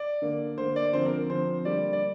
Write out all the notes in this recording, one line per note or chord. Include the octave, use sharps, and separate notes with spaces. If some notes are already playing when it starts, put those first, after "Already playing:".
Already playing: D5
D3 A#3
D3 A#3 C5
D5
D3 F3 C4 C5
A#4
D3 F3 C4 C5
D3 G3 A#3 D5
D5